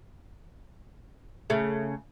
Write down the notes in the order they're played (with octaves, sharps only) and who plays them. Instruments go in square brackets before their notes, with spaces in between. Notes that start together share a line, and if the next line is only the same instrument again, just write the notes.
[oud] C#3 A3